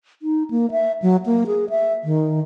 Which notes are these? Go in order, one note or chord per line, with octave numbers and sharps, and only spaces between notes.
D#4
A#3
E5
F#3
A#3
G#4
E5
D#3